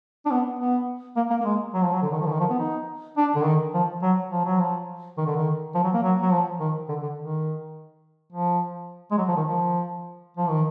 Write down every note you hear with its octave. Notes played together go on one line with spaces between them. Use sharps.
D4
B3
B3
A#3
A#3
A#3
G#3
F#3
F3
F#3
D3
D#3
F3
D3
D#3
F3
B3
D#4
D4
D3
D#3
F3
F#3
F3
F#3
F3
D#3
D3
D#3
F3
F#3
A#3
F#3
F#3
F3
D#3
D3
D3
D#3
F3
G#3
F#3
F3
D#3
F3
F3
D#3